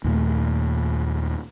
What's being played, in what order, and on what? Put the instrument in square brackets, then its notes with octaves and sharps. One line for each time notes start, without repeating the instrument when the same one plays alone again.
[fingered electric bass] D#2 A#2 A3